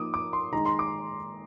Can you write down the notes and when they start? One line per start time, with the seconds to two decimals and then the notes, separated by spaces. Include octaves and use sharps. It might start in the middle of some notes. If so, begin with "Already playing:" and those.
Already playing: F3 A#3 D#4 D6 D#6
0.14 D6
0.33 C6
0.52 D#3 G#3 D#4 A#5
0.66 C6
0.79 D6